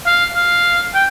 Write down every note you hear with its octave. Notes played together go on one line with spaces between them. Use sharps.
F5
F5
G5